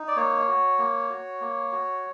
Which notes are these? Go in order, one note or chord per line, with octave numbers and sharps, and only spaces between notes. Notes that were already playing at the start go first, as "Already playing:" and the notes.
Already playing: D#4
D5
A#3 C#5
F#4
A#3
F#4
A#3
F#4